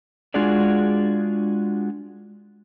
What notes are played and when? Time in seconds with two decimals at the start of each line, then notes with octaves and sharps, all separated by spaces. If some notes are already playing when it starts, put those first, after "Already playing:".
0.34 G#3 D4 F4 F#4 G#4 D5